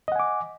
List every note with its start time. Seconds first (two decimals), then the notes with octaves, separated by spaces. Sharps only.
0.08 D#5
0.12 F#5
0.16 G#5
0.20 D6